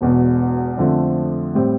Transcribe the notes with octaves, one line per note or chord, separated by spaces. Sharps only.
E1 E2 B2
F2 D3 F3 A3
A2 G3 C4